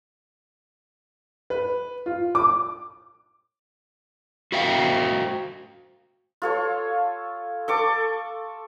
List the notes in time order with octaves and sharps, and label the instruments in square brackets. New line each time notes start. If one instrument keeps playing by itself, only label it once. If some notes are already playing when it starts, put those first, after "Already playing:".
[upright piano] B4
F4
D6
[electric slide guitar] F#4 C5 E5 F5 G5
[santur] F4 A4 C#5
A4 C#6 D6